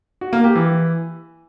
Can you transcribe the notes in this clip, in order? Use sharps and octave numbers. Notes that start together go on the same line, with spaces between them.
F#4
A#3
G4
E3